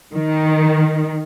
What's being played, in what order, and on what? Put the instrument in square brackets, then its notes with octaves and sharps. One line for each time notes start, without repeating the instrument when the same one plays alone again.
[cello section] D#3